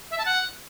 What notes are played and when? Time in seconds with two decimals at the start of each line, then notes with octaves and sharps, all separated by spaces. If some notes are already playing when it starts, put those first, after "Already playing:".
0.11 E5
0.18 A5
0.26 F#5